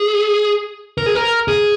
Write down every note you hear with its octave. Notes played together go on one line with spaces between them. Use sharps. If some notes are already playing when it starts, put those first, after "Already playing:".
Already playing: G#4
A#4
G#4
A#4
G#4